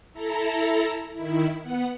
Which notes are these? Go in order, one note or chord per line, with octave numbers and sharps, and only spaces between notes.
E4 A4 A#5
D#3 E4
B3 F#5